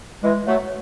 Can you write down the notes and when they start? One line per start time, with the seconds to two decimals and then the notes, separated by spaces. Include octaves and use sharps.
0.23 E3 G#3
0.47 F#3 A3